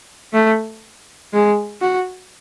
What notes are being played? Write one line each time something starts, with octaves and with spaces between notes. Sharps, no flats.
A3
G#3
F#4